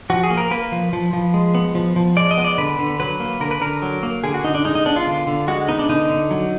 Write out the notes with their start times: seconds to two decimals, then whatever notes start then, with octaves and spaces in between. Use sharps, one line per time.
0.10 F3 F#4
0.24 G#4
0.30 A#3
0.37 A#4
0.51 A#3 B4
0.72 F3
0.93 F3
1.13 F3
1.34 G#3
1.55 B3
1.75 F3
1.96 F3
2.17 G#3 D5
2.31 D#5
2.37 B3
2.44 D5
2.58 D3 B4
2.79 D3
3.00 F#3 B4
3.20 A#3
3.40 D3 A#4
3.51 B4
3.61 D3 A#4
3.82 F#3
4.03 A#3
4.24 D3 G#4
4.34 F#4
4.44 D3 D#4
4.55 D4
4.65 G#3 D#4
4.75 D#4
4.86 B3 D4
4.96 F4
5.07 D3
5.27 D3
5.48 G#3 F#4
5.68 B3 D#4
5.79 D4
5.89 D3 D#4
6.10 D3
6.31 F#3